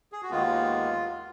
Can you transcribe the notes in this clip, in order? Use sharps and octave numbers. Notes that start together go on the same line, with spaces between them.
G#4
F#4
D#2 D#3 G#3 B3 F4